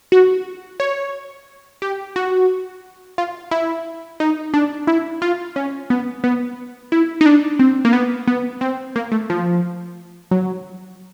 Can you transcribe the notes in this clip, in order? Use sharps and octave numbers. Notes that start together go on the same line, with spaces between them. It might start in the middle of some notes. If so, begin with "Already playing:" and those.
F#4
C#5
G4
F#4
F4
E4
D#4
D4
E4
F4
C#4
B3
B3
E4
D#4
D4
C4
A#3
B3
B3
C4
A#3
A3
F3
F#3